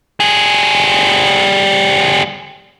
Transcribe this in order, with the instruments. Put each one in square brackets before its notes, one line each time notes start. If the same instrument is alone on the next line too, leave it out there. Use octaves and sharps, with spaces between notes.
[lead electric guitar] G3 G#4